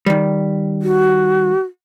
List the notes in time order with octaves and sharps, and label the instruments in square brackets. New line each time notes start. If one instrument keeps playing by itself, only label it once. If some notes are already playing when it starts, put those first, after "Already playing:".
[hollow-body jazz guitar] D#3 G3
[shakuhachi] F#4